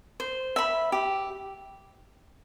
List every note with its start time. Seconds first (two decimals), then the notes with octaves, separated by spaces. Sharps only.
0.20 C5
0.56 E5 B5
0.92 G4